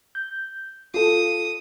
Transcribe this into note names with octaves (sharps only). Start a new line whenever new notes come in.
G6
F4 A4 D#6